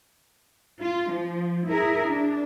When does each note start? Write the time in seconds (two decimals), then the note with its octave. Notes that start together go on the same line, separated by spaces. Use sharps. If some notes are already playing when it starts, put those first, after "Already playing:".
0.82 F4
1.13 F3
1.70 E4 G#4 A#4 E5
2.06 D4